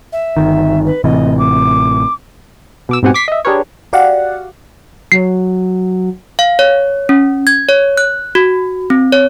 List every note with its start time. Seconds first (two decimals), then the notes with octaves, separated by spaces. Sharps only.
0.13 E5
0.37 G1 D#3
0.86 B4
1.04 A1 C3 E3 D#5
1.39 D6
2.89 B2 D6 E6
3.03 G#2 B2 C4 G4 F#5 G#5
3.14 D6 G#6 B6 C7
3.28 D#5 E5
3.45 D4 G4 G#4 A#4 B4 C#5
3.93 F#4 G4 D5 F5 F#5
5.12 F#3 C7
6.39 F5
6.59 C#5
7.09 C#4
7.47 G#6
7.69 C#5
7.97 F#6
8.35 F#4
8.90 C4
9.12 C#5